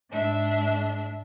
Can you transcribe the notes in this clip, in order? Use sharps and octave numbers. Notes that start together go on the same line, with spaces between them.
G#2 D4 E5